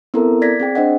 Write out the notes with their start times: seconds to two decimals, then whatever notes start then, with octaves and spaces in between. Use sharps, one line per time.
0.14 B3 C4 E4 A4 A#4 A#5
0.42 D5 G#6 A#6 B6
0.60 C4 G#4 G5
0.75 D4 C5 D#5 F#5